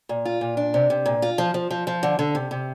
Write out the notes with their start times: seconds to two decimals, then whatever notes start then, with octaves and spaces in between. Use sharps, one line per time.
0.09 A#2
0.25 F4
0.41 A#2
0.57 D4
0.74 C3
0.90 C3
1.06 A#2
1.22 F4
1.38 F3
1.54 F3
1.71 F3
1.87 F3
2.03 D3
2.19 D3
2.35 C3
2.51 C3